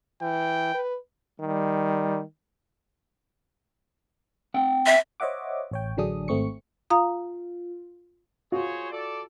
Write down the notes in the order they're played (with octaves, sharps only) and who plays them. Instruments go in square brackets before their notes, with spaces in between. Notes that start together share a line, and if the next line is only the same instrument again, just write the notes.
[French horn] E3 [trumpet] G5
[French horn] B4
[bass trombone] D#3 [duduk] G3
[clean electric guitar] C4 F#5 G5
[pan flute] E5
[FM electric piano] C5 C#5 D#5 E5 F#5 D6
A1 C#5 G5
A1 D3 F#3 D4 G#4 D#6
G#1 A3 C4 C#6 C#7
[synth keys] F4 [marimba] F5 A#5 D#6
[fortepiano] F4 F#4 [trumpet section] G#4 C5 C#5
[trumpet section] A4 D5